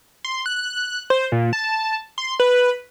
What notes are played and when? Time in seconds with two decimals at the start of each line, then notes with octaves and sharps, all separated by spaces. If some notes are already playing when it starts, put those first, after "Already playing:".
0.25 C6
0.46 F#6
1.10 C5
1.32 A#2
1.53 A5
2.18 C6
2.40 B4